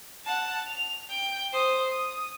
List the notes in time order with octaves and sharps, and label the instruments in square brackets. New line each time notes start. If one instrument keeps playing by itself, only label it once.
[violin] F#5 A5
F7
G5 G6
C5 D#6
D#6